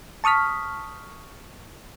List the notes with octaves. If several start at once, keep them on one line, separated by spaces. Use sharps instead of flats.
A5 C#6 D#6 F6 B6